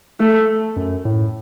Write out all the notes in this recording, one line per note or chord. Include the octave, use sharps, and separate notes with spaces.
A3
F#2
A2